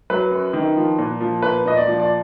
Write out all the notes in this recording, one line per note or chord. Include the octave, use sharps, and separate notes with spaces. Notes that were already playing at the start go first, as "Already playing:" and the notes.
F#3 B4
F#2
D#3
F3
A#2
F3
A#2 B4
A#2 D#5
D5
F3
D5